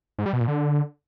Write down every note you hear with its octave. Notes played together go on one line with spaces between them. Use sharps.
G#2
G3
B2
A#2
D3